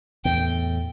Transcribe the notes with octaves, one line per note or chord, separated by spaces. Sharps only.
E2 A2 G5